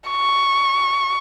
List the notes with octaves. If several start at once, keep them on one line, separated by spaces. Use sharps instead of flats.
C#6